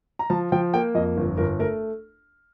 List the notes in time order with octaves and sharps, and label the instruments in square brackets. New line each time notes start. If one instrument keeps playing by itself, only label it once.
[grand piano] A#5
F3 A5
F3 G5
A#3 G5
F2 D#5
G1
G1 A#4
A3 A#4